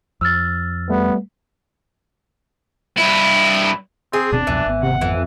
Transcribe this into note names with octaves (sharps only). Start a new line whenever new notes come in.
F2 E6 F6 A6
G3 A3 B3
G2 E4
C4 G#4
D#1 B2 C4 D4
C2 F2 B2 E3
G#1 B3
C3 F#5
F2 E3